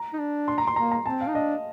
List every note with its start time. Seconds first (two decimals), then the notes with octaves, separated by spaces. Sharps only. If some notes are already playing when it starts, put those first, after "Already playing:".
Already playing: A#5
0.14 D#4
0.19 D4
0.48 C6
0.58 A#5
0.67 C6
0.76 A#3 A#5
0.92 A#5
1.05 C4 A5
1.21 F5
1.27 D#4
1.34 D4 D#5